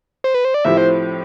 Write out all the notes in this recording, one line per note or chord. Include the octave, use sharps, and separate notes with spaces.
C5
B4
C5
D5
A2 F3 C4 E4 G4 E5
C5